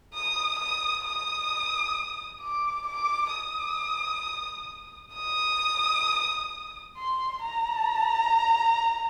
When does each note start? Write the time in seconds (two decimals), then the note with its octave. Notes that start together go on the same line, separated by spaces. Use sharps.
0.14 D#6
0.59 D#6
1.05 D#6
2.42 D6
2.87 D6
3.33 D#6
5.15 D#6
6.98 C6
7.43 A#5